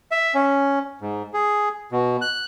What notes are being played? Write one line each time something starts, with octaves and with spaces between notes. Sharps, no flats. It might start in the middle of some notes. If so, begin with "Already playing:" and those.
E5
C#4
G#2
G#4
B2
F#6